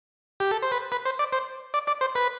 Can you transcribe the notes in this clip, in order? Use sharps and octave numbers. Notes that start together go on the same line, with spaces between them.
G4
A4
C5
B4
B4
C5
D5
C5
D5
D5
C5
B4